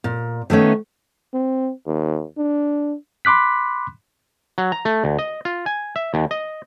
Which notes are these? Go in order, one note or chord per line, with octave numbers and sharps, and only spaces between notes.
A#2
D#3 A3 B3 C#4
C4
D#2
D4
B5 C6 D6 F#6 B6
F#3
A#5
A3
D2
D#5
F4
G#5
E5
D#2
D#5